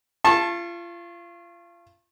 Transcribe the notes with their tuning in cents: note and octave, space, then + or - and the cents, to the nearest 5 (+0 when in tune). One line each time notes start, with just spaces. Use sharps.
F4 -30 A5 +0 C#6 -40